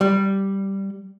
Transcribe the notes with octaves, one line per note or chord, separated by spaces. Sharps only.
G3